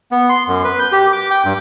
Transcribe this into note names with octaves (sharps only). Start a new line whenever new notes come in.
B3
C6
F#2
B4
G6
G4
D6
G5
G2